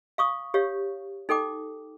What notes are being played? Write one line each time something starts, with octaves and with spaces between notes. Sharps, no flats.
F5 C#6 D#6
G4 C#5 F5
D#4 A4 G5 D6